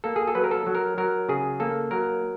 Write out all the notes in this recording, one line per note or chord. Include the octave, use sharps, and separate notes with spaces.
A#3 A4
G#4
A4
F#3 B4
A#4
A4
F#3
A#4
F#3 A#4
C#3 G#4
A#3 A4
F#3 A#4